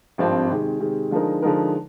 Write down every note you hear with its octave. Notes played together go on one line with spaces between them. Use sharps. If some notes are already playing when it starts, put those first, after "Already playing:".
G#1 G2 F3 C4
C3 D#3 G#3
C3 D#3 G#3
D3 F3 G#3 D#4 A#4
D3 F3 G#3 D#4 A#4